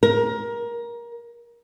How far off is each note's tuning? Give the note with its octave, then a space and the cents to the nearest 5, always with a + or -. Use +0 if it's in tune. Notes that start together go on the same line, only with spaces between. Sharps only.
A#4 +20